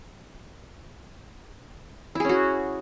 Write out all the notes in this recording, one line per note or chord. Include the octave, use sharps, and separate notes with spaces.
C#4 E4 F#4 G#4